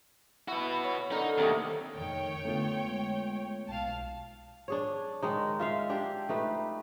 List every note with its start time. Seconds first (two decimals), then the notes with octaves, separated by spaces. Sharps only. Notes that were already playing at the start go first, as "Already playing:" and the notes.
0.48 E4 F#4 B4
0.84 C#5
1.12 D3 D#4 A#4
1.38 D#2 C3 A3 D#5
1.94 F1 D#3 C#5 G5
2.45 D3 A3 B3 F4
2.86 G#3
3.67 B1 F5 A5
4.68 D4 G#4 C#5
5.23 D#3 G#3 D#4
5.59 F4 E5 F5
5.90 D4 G4
6.29 A3 D#4 B4